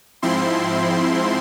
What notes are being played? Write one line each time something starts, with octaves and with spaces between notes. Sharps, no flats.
G#2 F3 C4 E4 C6